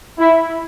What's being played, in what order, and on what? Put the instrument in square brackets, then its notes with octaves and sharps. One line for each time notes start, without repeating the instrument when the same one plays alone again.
[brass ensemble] E4